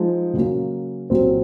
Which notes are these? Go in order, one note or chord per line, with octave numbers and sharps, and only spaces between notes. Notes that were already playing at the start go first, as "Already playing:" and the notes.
Already playing: F3 G#3 D#4
C#3 F#3 A#3 C#4
C2 A#2 F#3 C4